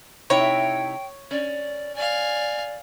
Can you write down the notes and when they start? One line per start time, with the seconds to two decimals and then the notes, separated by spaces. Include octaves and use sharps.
0.30 C3 D#4 E4 C#5 G5
1.31 C#4 D5
1.96 D5 F5 G#5